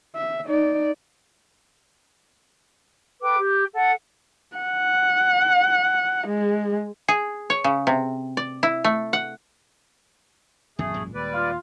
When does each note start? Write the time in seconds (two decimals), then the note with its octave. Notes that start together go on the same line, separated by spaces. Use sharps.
0.15 E5
0.46 D#4 D5
3.21 A4 B4 G5 D6
3.38 G4
3.73 A4 F#5
4.56 F#5
6.27 G#3
7.08 G#4
7.50 C#5
7.64 C#3
7.87 C3
8.37 D5
8.63 E4
8.84 A3
9.13 F#5
10.79 D1 A1 F#2 B2 D#3 A3 G#4
10.94 A#2 G#3
11.14 D#2 G3 B4 D5
11.34 F4